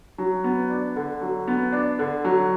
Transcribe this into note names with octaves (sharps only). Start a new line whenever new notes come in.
F#3
B3
D4
D3
F#3
B3
D4
D3
F#3